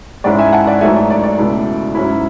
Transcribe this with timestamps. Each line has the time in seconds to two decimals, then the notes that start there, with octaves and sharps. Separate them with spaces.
0.24 G#2 G#3 C#4 E4 D5 F#5
0.39 E5 G#5
0.53 F#5 A5
0.67 D5 F#5
0.81 A1 G#2 F#3 A3 E5 G#5
0.95 D5
1.10 D5
1.23 D5
1.38 C#2 B2 A3 E4
1.95 G#2 F#3 C#4 E4